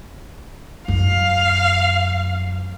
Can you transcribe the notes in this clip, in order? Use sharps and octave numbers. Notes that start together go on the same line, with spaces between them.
F#2 F5